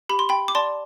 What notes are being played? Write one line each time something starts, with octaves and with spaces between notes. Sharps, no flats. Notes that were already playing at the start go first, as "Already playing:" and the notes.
G4 B5
C6
G5 B5
D6
D5 A5 C6